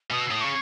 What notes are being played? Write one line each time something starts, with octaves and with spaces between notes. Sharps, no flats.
B2 D#6
E6
A2 D#6
C#3 C#6